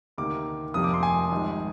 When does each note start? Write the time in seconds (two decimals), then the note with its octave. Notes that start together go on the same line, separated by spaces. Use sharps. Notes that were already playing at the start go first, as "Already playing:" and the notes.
0.18 D2 C3 D#3 A#3 D6
0.74 F1 F2 C3 F3 A#3 D#6
0.84 D6
0.94 C6
1.03 G#5
1.31 A#1 G#2 D#3 G3